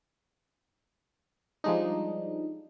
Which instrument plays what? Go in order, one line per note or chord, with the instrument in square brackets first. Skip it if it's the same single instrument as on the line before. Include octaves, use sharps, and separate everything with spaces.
[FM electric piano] F3 G3 G#3 D4 D#4